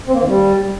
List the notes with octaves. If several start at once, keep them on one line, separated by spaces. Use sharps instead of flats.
C4
A#3
D#3
G3